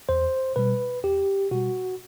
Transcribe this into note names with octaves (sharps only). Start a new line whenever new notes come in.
E2 C5
B2 G3 B4
E2 G4
B2 G3 F#4